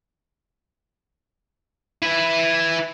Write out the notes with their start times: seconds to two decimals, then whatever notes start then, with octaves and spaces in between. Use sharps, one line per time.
2.03 E4 B4